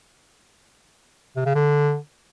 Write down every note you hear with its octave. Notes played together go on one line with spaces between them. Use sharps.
C3
C#3
D3